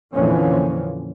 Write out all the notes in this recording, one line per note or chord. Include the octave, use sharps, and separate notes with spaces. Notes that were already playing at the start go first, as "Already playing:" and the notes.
F2 A#2 D3 E3 F3 C#4